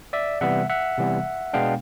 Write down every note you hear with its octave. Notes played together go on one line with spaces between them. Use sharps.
D5 E5
C3 E3 G3 B3 E5 F#5
E5 F#5
C3 E3 G3 B3
B2 G#3 B3 D4 F5 G5